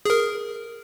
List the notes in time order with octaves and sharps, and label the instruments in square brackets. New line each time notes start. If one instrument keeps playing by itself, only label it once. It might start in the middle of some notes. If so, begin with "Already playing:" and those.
[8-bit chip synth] G#4 A#4